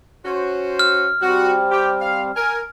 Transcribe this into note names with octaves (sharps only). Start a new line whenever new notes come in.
C#4 F#4 C5
F6
G3 C4 F#4
G4
F5
A#4 G#5